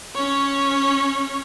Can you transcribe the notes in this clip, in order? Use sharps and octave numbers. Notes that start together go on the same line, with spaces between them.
C#4 C#5